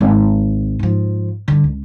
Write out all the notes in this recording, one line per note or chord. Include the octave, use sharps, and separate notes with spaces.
G#1
G#2 F3
G2 D3
C#2